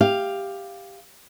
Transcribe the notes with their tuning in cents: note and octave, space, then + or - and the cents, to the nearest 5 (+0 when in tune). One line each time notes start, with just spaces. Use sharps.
G4 +10 F5 +0